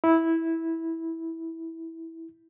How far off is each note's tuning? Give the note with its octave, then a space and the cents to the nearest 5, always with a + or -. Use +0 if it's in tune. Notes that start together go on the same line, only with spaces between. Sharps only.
E4 -10